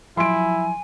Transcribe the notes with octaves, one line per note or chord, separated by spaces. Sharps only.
F3 F#3 E4 G#5 C6 D7